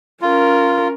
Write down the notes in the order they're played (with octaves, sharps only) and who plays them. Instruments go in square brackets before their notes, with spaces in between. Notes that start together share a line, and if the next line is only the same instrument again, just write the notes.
[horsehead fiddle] C#4 A#4 [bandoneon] F4